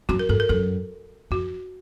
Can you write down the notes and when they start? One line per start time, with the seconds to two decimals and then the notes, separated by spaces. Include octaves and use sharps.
0.09 F#2 F#4
0.19 A#4
0.29 G2 A4
0.40 A#4
0.49 F#2 A4
1.31 F2 F#4